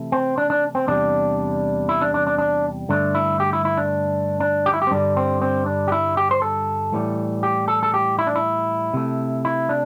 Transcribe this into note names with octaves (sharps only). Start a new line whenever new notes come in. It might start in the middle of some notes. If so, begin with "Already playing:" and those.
Already playing: C3 E3 A3
C4
D4
D4
C4
E2 C3 G3 D4
E4
D4
D4
D4
D4
G2 D3 A3 D4
E4
G4
E4
E4
D4
D4
G4
E4
G4
C4
G2 D3 G3 D4
C4
C4
D4
G4
E4
G4
C5
A4
A2 E3 G3
G4
A4
A4
G4
E4
D4
E4
C3 A3
E4
D4